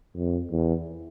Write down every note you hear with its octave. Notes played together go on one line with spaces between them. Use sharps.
F2
E2